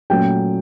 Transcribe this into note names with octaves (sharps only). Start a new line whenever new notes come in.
A#2 F#3 A3 C#4 G5